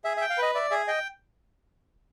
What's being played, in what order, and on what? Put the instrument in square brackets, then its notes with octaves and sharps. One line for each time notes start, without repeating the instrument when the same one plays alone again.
[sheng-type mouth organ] G#4 [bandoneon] E5
[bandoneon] E5
[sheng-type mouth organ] G5
[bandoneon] F5
[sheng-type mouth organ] B4 [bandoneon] D#5
[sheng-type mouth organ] D5 [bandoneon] E5
[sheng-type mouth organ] G#4 [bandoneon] E5
[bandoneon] D#5 [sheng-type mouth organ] G5